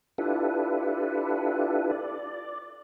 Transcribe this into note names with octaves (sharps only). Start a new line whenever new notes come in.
D4 E4 F4 G4 A4 B4
D5